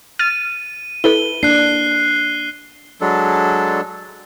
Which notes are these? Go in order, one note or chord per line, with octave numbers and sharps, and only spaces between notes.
F6 A6 D#7
E4 A4 B4 G7
A#3 D4 F#6 C7
F#3 G#3 D4 A4